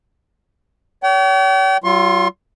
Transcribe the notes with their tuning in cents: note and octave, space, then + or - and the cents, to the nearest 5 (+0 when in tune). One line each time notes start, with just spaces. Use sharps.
C#5 +40 G5 -40
F#3 +35 F4 -15 C6 +35